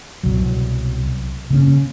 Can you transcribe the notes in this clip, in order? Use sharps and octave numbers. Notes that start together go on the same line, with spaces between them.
C2 B2 F#3
C#3 A#3 C#4